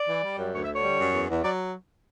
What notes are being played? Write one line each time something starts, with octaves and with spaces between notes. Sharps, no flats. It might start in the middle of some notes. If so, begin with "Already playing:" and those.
Already playing: D5
E3
G3
F#2
D2 C#5
E5
D3 C#5
G3
F#2
E2
E2
F#3 D5